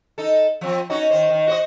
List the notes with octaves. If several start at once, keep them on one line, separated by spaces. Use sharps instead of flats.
D#4 A4
F3 C4
C#4 D#4 F#4
D#3 C5
D#3
F#4 C5 D#5